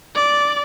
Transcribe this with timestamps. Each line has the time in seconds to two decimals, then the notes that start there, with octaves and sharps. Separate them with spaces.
0.15 D5